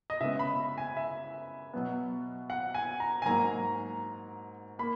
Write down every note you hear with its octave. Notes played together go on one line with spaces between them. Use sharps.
D#5
C#3 G#3 B3 E5
B5
G#5
E5
B2 F#3 B3
F#5
G#5
A#5
G#5
G#2 F#3 A#3 A#5
A#3 B5